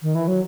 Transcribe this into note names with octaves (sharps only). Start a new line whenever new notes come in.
D#3
E3
F#3